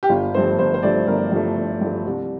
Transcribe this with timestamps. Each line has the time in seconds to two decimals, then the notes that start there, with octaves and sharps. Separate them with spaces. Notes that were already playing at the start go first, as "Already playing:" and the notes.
0.03 G4
0.09 G1 F4
0.34 G2 F3 A3 C5
0.59 G1 C5
0.74 C5
0.83 G2 F3 A3 D5
1.07 G1 A#4
1.32 G2 F3 A3
1.57 G1
1.81 G2 F3 A3
2.06 C2